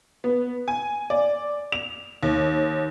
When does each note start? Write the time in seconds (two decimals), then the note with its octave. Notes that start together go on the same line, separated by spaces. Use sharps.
0.24 B3
0.68 G#5
1.10 D5
1.72 F7
2.23 D#2